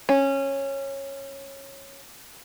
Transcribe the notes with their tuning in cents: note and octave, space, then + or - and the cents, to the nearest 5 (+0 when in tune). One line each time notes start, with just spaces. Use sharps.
C#4 -15